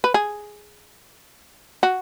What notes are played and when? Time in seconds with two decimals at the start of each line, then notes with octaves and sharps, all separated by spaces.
0.04 B4
0.14 G#4
1.83 F#4